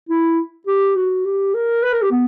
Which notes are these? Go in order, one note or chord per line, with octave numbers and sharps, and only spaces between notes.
E4
G4
F#4
G4
A#4
B4
A#4
G4
B3